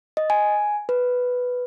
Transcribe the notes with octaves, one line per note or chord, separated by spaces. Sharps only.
D#5
G#5
B4